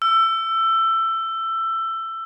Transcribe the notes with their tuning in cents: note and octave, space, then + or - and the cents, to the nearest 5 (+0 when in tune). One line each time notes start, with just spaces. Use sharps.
E6 +20